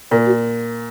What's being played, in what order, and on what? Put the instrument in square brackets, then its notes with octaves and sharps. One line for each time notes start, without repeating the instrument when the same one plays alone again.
[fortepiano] A#2 [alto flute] A#4
[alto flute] F#4